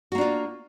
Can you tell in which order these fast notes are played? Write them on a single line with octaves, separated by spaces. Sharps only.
F#4 A#3 D4 F4